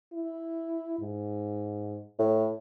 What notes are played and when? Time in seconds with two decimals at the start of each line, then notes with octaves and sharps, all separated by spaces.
0.13 E4
1.00 G#2
2.19 A2